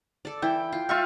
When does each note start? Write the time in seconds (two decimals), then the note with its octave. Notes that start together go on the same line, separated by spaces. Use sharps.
0.25 A4 D5
0.42 E3 E4 G5
0.72 F4
0.89 F4 E5 F5 C#6